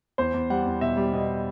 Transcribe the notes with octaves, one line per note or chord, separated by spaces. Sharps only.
E2 C5
E2
G3 F#5
E2
B2 E5
G3
B2 D#5